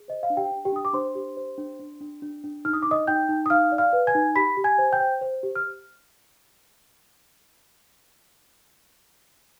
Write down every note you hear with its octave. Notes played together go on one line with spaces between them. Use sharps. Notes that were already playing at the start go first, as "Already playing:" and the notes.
Already playing: G#4
C5 D#5
F5
D4
G4 G5
D4
G4 G5
D4 D#6
D6
D4 C5 C6
G4
C5
D4
D4
D4
D4
D4
D#4 F6
D#6
D#4 D6
D#5 D#6
D#4 G5 G6
D#4
D#6
D#4 F5 F6
D5
F5 F6
B4
G#5 G#6
D#4
G4 B5 B6
G4
G#5 G#6
C5
G5 G6
C5
C5
G4
F6